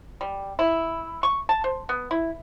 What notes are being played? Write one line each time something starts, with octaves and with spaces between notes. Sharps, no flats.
G3
E4
C#6
A5
C5
B3
E4